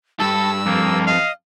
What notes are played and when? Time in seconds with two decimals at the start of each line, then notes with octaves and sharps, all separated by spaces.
0.20 G2 A4 E6
0.66 F2 A#3
1.07 D#5 F5